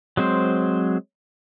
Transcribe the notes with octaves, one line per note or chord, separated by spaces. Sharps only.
F#3 G#3 C4 C5